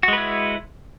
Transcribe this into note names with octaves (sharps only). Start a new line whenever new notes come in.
G#3 E4 F#4 B4